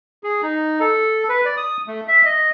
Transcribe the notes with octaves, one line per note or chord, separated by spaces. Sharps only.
G#4
D#4
A4
B4
D5
D#6
A3
E5
D#5